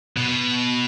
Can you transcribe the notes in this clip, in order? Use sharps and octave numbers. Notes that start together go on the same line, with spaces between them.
B2